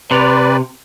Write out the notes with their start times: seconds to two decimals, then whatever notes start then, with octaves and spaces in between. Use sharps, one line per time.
0.11 C3 B4 D5